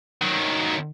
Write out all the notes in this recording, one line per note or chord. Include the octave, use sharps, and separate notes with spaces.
D#3 F#3